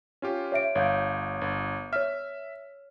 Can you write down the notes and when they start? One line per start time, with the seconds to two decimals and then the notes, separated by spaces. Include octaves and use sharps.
0.22 C#4 F4 G4
0.52 C#5 E5 D7
0.75 G1 C#5 F5 G6
1.41 G1
1.93 C#5 E5 F6